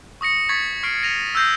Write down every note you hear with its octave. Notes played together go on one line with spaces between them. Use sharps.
C#6 D#6 A#6 C#7
C#6 G#6 A6 B6
C#6 F6 C7 D7
A#6 C#7 D#7 F7
E6 F#6 G6 A#6 C7